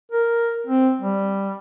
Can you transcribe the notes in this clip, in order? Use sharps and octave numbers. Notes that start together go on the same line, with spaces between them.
A#4
C4
G3